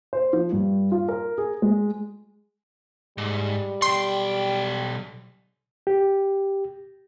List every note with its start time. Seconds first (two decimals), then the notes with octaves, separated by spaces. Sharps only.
0.13 C5
0.33 F3
0.52 G2
0.92 F4
1.09 A#4
1.38 G#4
1.62 G#3
3.18 G#2 G3
3.82 B1 G5 C6
5.87 G4